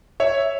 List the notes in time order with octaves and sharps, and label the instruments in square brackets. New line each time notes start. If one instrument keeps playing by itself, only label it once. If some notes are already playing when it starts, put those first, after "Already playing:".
[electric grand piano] C#5 E5